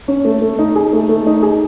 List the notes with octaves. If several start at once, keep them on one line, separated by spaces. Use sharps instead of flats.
C#4
A3
A3
D#4
G#4
A3
A3
D#4
G#4